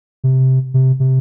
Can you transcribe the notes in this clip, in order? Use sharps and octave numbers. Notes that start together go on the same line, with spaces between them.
C3
C3
C3